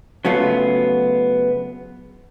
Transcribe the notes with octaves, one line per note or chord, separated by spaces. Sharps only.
C#3 F#3 A3 B3 F4